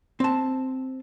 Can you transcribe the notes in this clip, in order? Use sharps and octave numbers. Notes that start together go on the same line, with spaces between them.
C4 A5